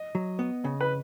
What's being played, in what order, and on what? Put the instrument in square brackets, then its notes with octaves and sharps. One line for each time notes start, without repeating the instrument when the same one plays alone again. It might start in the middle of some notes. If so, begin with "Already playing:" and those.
Already playing: [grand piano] D#5
[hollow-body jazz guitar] F#3
B3
C#3
[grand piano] B4